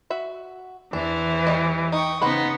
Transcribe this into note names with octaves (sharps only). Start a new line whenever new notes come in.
F#4 E5
E2 E3 D4 C5
G3 D5 D#5
D#4 G5 C#6 D#6
C#3 B3 D#4 B4 C5 F#5